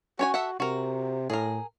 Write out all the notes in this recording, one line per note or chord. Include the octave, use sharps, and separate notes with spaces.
C#4 F#4 C#5 G#5
A4 E5 F#5
C3 F#4 A#4
A2 G#4 A#4